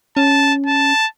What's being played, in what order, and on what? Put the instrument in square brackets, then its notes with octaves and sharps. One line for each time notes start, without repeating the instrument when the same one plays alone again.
[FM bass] C#4 [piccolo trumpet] A5
[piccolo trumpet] A5